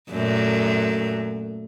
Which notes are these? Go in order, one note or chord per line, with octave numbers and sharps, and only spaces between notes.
F#2 A#2 A3